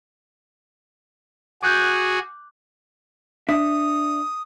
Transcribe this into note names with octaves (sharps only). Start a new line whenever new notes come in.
F#4 G#4 D6 F#6 G6
D4 E5 D#6